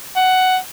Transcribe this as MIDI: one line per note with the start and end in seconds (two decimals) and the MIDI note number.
0.16 0.57 78